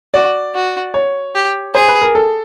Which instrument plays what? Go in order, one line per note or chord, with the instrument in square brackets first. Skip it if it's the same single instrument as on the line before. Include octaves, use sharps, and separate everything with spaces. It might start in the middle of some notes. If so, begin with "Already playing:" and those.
[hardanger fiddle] F#4 [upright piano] D5
[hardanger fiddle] F#4
[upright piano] C#5
[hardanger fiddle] G4
[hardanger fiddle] G#4 [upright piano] C5
[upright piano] B4
A#4
A4